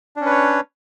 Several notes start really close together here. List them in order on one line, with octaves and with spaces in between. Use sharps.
D4 C#4 B4 C#5